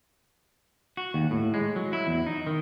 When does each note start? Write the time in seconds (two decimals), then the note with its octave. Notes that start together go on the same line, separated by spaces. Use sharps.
0.97 F#4
1.14 D#2
1.31 A2
1.54 G#3
1.76 F#3
1.93 E4
2.07 E2
2.26 D#4
2.47 D#3